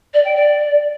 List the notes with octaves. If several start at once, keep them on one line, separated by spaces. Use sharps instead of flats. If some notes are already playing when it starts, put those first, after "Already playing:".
D5
G5
D5